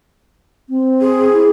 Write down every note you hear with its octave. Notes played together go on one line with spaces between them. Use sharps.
C4
G#4
E4